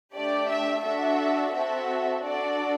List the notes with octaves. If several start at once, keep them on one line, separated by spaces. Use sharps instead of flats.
A3 D4 G4 D5
E5
D4 F#4 A4 E5
C4 F#4 A4 E5
D4 F#4 A4 D5